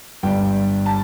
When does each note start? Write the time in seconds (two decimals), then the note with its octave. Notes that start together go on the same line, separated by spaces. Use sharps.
0.23 G1 G2 G3 G5
0.86 A5